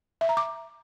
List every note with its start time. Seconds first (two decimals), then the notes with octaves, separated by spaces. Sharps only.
0.21 E5
0.29 A#5
0.37 D6